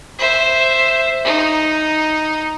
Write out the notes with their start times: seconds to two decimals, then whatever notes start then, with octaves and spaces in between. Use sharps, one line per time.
0.19 C5 E5
1.24 D#4